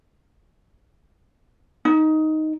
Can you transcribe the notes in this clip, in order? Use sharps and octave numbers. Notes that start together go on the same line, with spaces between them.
D#4